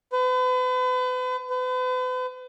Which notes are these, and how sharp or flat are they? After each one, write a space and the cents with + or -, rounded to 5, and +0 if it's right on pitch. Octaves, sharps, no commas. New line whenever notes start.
B4 +40
B4 +40